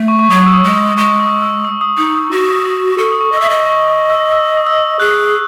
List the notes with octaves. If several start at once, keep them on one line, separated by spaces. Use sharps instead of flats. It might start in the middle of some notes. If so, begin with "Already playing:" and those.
Already playing: A3
C#6
C#6
F#3 D#6
E6
D#6
G#3
D#6
G#3 C#6
D#6
E6
D#6
D#6
D#4 D#6
D#6
F#4 C#6
E6
D#6
A4 C#6
D#6
C#6
D#5
E6
E5 D#6
D#5
C#6
D#6
E6
E6
D#6
E6
G#4 F#6